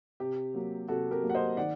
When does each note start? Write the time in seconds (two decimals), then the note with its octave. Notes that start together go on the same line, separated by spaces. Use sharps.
0.20 C3 G4
0.54 F#3 A#3
0.88 C3 F#4 A4
1.11 G4 A#4
1.22 F#3 A#3
1.30 F#5
1.35 C5 D#5
1.57 D#3 D5 F#5